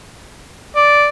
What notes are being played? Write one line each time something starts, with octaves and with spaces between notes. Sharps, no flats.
D5